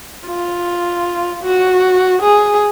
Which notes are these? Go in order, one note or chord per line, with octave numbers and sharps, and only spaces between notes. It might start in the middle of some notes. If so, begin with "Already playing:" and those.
F4
F#4
G#4